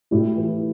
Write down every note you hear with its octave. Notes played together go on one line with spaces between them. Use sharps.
A2 E4 G4
E3